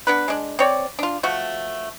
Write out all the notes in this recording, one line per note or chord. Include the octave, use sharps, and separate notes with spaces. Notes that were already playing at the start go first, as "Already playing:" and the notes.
B3 D4 B4
G#3 D4
C4 C#5 D5
D4 F4
F3 A3 F#4